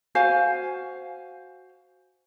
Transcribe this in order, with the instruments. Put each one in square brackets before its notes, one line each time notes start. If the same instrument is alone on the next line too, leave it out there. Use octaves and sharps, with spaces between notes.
[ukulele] F#4 C5 F5 G#5